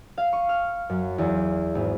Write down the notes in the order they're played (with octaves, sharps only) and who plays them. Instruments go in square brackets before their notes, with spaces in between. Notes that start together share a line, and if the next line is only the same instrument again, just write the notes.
[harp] F5
C#6
F6
F#2
E2
G#1